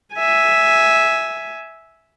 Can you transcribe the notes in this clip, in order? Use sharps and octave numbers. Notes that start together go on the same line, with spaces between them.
E5 G#5